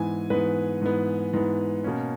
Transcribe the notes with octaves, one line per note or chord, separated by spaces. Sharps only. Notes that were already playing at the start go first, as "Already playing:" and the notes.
Already playing: G#2 E3 B3 G#5
G#2 E3 B3 B4
G#2 E3 B3
G#2 E3 B3
B2 A#3 C#4